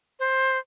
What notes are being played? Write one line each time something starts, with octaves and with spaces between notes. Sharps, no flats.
C5